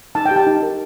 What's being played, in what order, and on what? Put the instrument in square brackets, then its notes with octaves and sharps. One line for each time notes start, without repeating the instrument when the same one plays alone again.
[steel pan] D#4 A5
G5
G4
A5
D#4
A#4